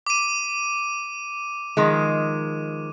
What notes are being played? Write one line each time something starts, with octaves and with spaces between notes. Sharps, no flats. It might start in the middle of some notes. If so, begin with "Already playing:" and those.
D6 D#7
D#3 F3 G#3